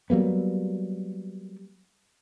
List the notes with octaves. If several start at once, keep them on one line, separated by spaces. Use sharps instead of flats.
F#3 G3 A#3 B3